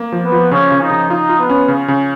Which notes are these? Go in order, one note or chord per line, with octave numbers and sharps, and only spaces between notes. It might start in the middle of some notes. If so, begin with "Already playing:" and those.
Already playing: A#3
F3
B3
F3
C#3 C#4
C#3
D#4
C#3
D#4 F4
F4
B3
C#4
C#3
C#3